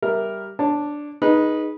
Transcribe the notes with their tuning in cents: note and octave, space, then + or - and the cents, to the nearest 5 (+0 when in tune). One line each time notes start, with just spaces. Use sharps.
G3 +0 A#4 +0 E5 +0
D4 +0 C#5 -25 A5 +0
D#4 +0 G#4 +5 B4 -15